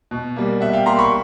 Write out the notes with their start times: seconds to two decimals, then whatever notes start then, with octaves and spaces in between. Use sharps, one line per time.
0.11 B2
0.36 G3 A#3
0.61 B2 E5 F#5
0.73 F5 G5
0.86 G3 A#3 A#5 C6
0.99 B5 C#6